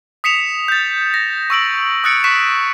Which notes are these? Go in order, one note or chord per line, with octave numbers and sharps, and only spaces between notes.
D#6 B6 C#7 E7 F7
G6 A6
A#6
C#6 E6 D7 F#7
D#6 E6 F#6 A6 C#7 D7
C#6 F#6 B6 E7